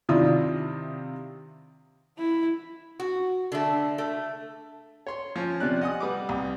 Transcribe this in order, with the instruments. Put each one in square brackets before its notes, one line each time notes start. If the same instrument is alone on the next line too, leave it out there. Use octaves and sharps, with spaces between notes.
[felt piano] C3 D#3 D4 E4 F4 D#6
[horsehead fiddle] E4
[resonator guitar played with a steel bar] F#4
D3 A3
A3
[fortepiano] C#5 C6
F3 C#4
C3 F3 D5 F#6
D#5 F#5 G#5 D#6
G3 B4 F#5 D6
C2